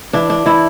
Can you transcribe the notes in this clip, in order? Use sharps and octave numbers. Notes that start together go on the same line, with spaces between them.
E3 D4
D4
E3 E4